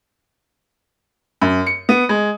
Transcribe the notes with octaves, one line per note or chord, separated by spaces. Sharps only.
F#2
C#7
B3
G#3